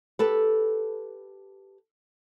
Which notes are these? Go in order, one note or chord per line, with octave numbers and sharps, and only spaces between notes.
G4 A4 B4